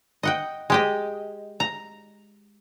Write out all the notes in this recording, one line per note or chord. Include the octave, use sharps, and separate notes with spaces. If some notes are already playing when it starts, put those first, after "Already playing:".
D#5 F#5 G5
G#3 G4 D#5
A#5